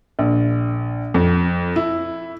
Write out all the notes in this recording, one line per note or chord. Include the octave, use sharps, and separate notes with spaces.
A#1
F2
E4